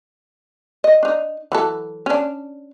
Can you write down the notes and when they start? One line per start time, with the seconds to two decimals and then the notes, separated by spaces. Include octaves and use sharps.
0.84 D#5
1.03 D4 D#4
1.52 E3 F#3 A4
2.06 C#4 D4